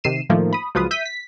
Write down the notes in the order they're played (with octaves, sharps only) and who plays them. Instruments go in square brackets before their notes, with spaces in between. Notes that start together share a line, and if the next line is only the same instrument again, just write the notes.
[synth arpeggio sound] C3 D#3 C7 D#7 E7
A2 D#3 F3 A3 A#3
B5 D#6
C#2 F3 F#3 F4 B4 D#6
E5 G6 B6 D#7
B6